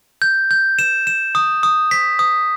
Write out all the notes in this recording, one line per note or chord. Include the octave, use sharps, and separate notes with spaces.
G6
G6
E7
E7
D#6
D#6
B6
D#6